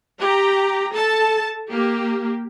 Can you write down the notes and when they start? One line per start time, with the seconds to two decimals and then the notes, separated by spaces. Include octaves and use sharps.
0.20 G4 A#5
0.94 A4 A5
1.71 A#3 G4